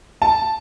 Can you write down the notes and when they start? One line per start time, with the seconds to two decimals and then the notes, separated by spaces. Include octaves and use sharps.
0.22 A5